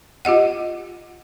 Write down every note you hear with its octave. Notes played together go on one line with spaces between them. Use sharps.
F4 G4 D#5 F#5